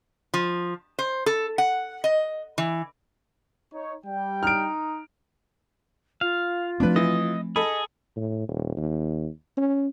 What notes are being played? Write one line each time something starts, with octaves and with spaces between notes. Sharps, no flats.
F3
C5
A4
F#5
D#5
E3
D#4 C#5
G3 G5
D#4 F6 D7
F4 F5
F3 A3 C4 D4 B4
E3 D#5
G#4 A4 D#5 B5
A2
D#1
D#2
C#4